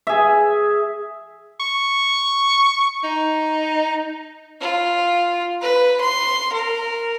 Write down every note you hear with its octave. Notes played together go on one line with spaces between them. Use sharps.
G#4 E5
C#6
D#4
F4
B4
C6
A#4